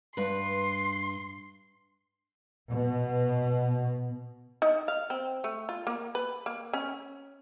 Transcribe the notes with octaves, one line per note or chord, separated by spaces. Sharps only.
G2 B4 C6
B2
D#4
F5
C4
A3
F4
A#3
B4
A#3
C#4